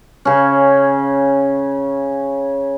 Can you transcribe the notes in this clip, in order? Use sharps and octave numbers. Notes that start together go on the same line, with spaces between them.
C#3 C#4